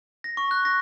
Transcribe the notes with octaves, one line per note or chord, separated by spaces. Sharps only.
A#6
C#6
F#6
A#6